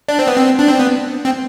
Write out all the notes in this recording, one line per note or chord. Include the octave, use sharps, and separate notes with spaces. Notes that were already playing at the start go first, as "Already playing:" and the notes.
D4
C4
B3
C4
D4
C4
B3
C4